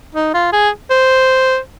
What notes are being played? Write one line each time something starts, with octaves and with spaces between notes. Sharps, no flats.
D#4
F4
G#4
C5